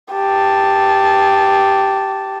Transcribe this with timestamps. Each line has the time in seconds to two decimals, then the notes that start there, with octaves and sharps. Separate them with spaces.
0.14 G4 A5